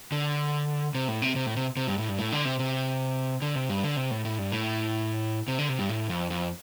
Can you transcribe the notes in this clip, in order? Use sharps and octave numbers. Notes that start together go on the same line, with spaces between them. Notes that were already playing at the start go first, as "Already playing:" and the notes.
D3
C3
A2
C3
C3
A2
C3
C3
G2
A2
G2
A2
D3
C3
C3
D3
C3
G2
D3
C3
A2
A2
G2
A2
C3
D3
C3
G2
A2
F2
F2